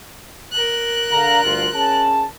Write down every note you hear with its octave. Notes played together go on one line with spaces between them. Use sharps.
A#4 F#6
D3 F5 A#5
D2 G2 F4
C#4 G#4 A5